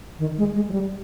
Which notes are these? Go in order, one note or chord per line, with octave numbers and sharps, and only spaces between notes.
D#3
G#3
G#3
F#3
G3